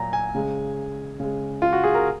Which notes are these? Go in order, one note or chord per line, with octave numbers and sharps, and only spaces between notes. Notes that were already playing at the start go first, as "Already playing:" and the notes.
Already playing: A#2 F#3 A#5
G#5
C#3 G#3
C#3 G#3
F4
F#4
G#4
A#4